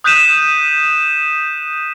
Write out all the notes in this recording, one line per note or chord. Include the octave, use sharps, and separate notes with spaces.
D#6 F#6 G6 B6 D#7 E7